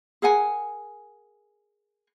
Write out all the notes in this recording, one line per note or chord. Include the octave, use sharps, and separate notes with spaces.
G#4 A#4 F#5 G#5